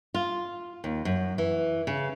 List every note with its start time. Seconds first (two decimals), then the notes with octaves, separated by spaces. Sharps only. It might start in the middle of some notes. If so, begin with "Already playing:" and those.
0.14 F4
0.84 D#2
1.05 F#2
1.38 E3
1.87 C#3